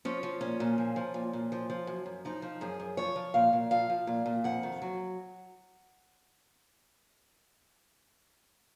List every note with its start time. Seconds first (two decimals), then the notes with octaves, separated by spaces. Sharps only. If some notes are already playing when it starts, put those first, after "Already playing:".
0.05 F3 C#4
0.23 F3
0.41 A#2 C#4
0.60 A#2
0.78 F3
0.96 F3
1.14 A#2
1.33 A#2
1.52 F3
1.70 F3
1.87 F#2
2.06 F#2
2.25 F3 D#4
2.42 F3
2.61 F#2 G#4
2.80 F#2
2.97 F3 C#5
3.16 F3
3.34 A#2 F5
3.53 A#2
3.71 F3 F5
3.90 F3
4.07 A#2
4.26 A#2
4.44 F2 F#5
4.63 D#3
4.82 F#3